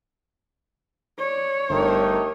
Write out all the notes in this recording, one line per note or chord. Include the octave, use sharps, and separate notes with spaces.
C#5 D5
G1 A3 D#4 G4 A#4